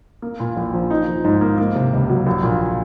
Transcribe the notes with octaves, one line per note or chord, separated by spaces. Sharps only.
A#3
A#2
A#1
F3
D#4
F3
G#2
A#3
A#3
C3
C#2
F#3
A#1
A#2